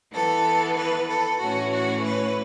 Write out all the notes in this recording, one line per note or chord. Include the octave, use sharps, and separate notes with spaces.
E3 B3 A4
B4
A4
A2 E3 A3 C#4 F#4
F#4
B4